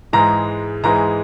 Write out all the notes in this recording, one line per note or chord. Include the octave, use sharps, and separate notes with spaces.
G#2 E3 G#3 A#5
G#2 E3 G#3 A#5